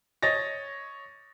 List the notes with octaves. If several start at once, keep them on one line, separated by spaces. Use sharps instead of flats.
C#5 D#5 A6 A#6